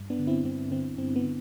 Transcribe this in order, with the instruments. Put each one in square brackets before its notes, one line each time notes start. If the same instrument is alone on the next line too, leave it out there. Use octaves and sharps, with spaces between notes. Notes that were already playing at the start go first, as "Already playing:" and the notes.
Already playing: [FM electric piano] G2
B3 D4
D3
C4 E4
G2 C4
D3 C4
G2 C4
B3
D3